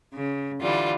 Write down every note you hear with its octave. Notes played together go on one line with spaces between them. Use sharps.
C#3
D3 E3 G3 F4